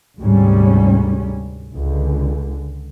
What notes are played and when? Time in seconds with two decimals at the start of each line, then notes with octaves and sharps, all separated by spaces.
0.19 D2 G#2 C3 G3 C#4
1.73 C#2 D3